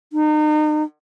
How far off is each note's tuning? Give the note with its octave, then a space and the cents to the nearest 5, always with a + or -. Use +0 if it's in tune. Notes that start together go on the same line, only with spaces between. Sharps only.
D#4 -35